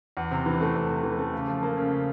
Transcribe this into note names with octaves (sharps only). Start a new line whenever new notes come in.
E2
C3
E3
A3
E2
C3
E3
A3
C#3
F3
A#3
C#3
C#3